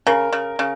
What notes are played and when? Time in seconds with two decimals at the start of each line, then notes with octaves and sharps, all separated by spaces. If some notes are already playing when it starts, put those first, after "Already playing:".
0.07 C#3 A#4
0.33 C#3
0.59 C#3